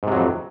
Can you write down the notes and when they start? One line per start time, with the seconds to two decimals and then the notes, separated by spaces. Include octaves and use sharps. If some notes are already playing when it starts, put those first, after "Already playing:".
0.03 G#2
0.07 C3
0.12 F#3
0.16 F2